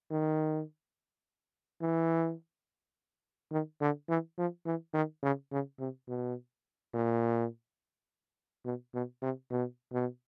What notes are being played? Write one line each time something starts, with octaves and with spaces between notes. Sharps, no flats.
D#3
E3
D#3
D3
E3
F3
E3
D#3
C#3
C#3
C3
B2
A#2
B2
B2
C3
B2
B2